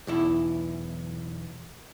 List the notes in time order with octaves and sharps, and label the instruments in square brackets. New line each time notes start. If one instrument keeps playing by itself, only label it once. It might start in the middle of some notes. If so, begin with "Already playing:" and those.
[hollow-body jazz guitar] B1 E2 E4